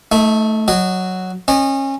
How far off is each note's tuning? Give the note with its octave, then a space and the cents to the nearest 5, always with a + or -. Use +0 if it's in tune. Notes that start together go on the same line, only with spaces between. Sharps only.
A3 +0 D#4 +40
F#3 +0 D#5 -20
C#4 -30 D#5 -30